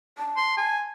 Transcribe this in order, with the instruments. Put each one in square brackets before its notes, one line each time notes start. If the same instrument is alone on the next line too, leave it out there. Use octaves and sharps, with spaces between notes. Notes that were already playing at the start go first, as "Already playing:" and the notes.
[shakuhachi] A5
[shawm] C6
G#5